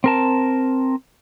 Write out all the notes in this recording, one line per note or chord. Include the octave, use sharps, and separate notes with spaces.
C4 A#4 A5